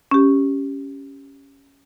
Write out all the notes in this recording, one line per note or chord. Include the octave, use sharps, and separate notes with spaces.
C#4 G4